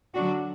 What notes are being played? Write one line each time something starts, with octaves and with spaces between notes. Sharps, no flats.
D3 F#3 D4 F#4